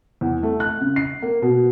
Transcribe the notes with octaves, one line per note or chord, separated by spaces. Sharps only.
E2
A3
F#6
C#3
C7
A#3
B2